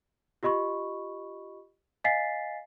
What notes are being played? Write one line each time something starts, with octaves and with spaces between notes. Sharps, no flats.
F4 G4 D#5 B5 C#6
D#5 F5 G#5 A6 B6 C7